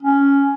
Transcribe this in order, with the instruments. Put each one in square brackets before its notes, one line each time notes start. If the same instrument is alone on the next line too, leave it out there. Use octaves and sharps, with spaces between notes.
[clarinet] C#4